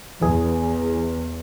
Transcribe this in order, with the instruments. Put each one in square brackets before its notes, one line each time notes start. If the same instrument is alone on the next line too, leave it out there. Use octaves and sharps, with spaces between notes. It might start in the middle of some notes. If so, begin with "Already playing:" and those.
[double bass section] E2 [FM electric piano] E3 G#4